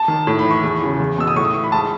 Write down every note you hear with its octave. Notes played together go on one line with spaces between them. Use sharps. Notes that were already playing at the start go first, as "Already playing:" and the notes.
Already playing: A5
D#3
A2
B5
E3
C#6
E2
C#3 E3
E2
B2 E6
D#6
A2 C#6
D#6
E3 C#6
B5
G#2 A5